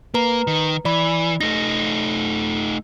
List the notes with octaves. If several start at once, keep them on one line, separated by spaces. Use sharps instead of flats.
A#3 B4 A#5
D#3
E3 D5 B5
A3 D#4 A#6